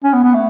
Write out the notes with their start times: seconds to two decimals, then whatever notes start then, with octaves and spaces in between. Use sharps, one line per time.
0.04 C#4
0.13 B3
0.24 B3
0.34 A3